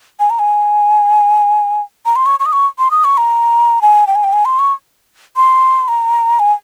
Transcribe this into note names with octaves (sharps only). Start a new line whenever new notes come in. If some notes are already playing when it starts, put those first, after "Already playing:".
G#5
A#5
G#5
A#5
C6
C#6
C#6
D#6
C#6
C6
D#6
C#6
A#5
G#5
G5
G#5
G5
G#5
C6
C#6
C6
A#5
G#5